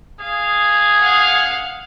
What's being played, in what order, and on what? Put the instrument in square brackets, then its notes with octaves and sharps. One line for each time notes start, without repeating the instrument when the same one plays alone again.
[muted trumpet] G#4 [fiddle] F5
[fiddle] F5 F#5